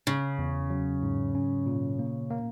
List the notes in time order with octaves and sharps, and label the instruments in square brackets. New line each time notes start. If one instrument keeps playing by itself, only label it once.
[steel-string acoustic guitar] C#3 [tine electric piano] C#4
[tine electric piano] E2
F#3
G#2
C#4
A#2
A#3
A#3